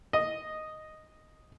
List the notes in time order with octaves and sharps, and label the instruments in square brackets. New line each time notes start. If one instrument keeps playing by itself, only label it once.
[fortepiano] D#5